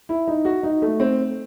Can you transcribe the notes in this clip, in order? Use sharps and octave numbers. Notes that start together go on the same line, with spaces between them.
E4
D#4
F#4
D#4
A3
C4